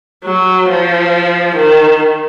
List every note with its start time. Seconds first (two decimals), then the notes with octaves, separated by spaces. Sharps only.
0.25 F#3
0.69 F3
1.56 D#3